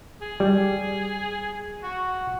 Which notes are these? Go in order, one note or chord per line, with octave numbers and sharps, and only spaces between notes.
G#4
G3
F#4